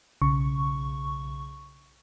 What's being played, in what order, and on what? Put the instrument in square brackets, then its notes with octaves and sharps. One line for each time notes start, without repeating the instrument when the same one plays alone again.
[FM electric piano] B1 C#3 C#6